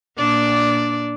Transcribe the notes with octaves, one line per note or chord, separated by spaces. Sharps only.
A#2 D4 D5